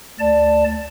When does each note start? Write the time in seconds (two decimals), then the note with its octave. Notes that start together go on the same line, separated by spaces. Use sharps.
0.19 D2 D5 A5